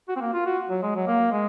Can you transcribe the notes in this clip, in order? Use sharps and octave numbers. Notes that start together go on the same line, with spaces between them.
F#4
C4
A#3
F4
F#4
F#3
G#3
F#3
A#3
G#3